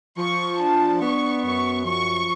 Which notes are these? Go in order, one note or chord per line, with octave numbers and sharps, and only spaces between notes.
F3 C#6
D4 A5
B3 C#6
F#2 C#6
F3 C#6